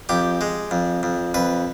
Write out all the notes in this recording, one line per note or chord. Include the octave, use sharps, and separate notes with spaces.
F2 G4
G#3
F2
F2
F2 B4